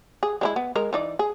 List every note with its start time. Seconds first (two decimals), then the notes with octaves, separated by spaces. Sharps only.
0.23 G#4
0.41 G#3 D#4 E4
0.56 B3
0.76 G#3 A#4
0.93 E3 D#4 D5
1.19 G#4